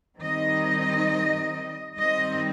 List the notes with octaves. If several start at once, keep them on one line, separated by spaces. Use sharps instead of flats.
D#3 G3 C4 D#4 D#5
D#3 G3 C4 D#5